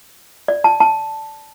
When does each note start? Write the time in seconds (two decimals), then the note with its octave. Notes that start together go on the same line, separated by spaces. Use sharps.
0.48 D5
0.64 A5
0.80 A5